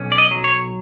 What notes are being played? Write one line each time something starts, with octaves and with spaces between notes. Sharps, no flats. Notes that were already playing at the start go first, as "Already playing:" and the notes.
Already playing: B1 C#4
D5
D#5
F#3
C#5